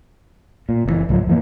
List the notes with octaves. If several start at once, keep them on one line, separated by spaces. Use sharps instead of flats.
A#2
F#1 B2 E3
C#2 G#2 F3 F#3
F2 E3 A#3